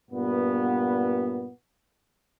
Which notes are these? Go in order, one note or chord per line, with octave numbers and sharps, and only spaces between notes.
G2 A#2 B3